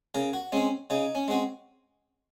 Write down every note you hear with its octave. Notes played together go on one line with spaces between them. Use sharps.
C#3 A#4
F#4
G#3 C4 C#4
C#3 D#4
C#4
G#3 C4 F#4